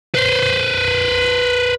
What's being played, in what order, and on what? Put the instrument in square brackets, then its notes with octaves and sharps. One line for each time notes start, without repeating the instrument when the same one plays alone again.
[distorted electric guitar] B4 C5